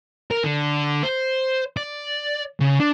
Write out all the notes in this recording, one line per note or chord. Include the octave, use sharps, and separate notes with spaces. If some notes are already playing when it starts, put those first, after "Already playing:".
A#4
D3
C5
D5
C#3
D4